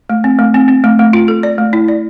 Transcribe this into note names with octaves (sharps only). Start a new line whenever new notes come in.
A3
C4
A3
C4
C4
A3
A3
F4
A4
D5
A3
E4
D5